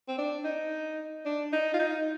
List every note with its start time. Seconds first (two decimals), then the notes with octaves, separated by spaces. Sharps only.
0.08 C4
0.18 D4
0.44 D#4
1.25 D4
1.52 D#4
1.74 F4
1.79 D#4